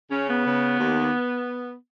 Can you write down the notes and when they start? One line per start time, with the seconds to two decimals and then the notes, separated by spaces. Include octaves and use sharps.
0.10 C#3 C#4
0.28 B3
0.45 C#3
0.79 D#2